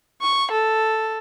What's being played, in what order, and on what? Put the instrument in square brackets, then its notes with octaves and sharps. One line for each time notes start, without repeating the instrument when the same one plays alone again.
[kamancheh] C#6
A4